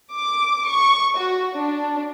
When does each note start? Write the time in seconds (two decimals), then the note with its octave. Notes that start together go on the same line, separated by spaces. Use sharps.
0.16 D6
0.70 C#6
1.19 F#4
1.56 D4